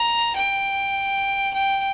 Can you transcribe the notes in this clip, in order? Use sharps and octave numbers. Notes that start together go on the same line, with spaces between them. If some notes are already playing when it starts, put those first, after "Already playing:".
Already playing: A#5
G5
G5